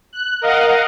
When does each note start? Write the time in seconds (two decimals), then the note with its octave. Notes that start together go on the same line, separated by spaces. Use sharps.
0.13 F#6
0.41 A#4 D#5 F5 F#5